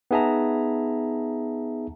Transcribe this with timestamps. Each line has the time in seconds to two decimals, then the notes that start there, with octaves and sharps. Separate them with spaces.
0.11 B3 D#4 G#4 E5 A5 A#5